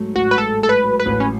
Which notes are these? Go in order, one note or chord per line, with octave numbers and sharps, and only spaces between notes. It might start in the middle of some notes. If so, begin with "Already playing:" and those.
Already playing: G#2 F#3 A3
A1 F#4
B4
G#2 A4
A3 A4
B4
F#3
B4
A1
C#4